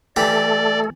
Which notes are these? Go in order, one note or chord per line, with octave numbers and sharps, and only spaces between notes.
E3 A3 G4 A4 D5